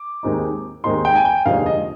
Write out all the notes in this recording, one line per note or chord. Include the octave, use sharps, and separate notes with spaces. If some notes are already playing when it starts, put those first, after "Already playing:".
Already playing: D6
D#2 D#3 G#3 C4 D#4
D#2 D#3 G#3 C4 D#4 C6
G5
G#5
G5
F1 D#2 D3 F3 G#3 F5
D#5